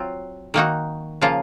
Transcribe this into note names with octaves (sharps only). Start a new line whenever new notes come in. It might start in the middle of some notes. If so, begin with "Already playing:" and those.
Already playing: F#3 C4 F4
D#3 A#3 D#4 F#4
C#3 F3 A#3 F4